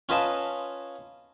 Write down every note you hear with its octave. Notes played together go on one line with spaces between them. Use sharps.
C#4 F4 B4 D#5 F5 A5